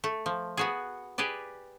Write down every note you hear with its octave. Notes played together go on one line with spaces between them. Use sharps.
A3
F3
B3 F#4 G#4
G4 G#4 B4 D5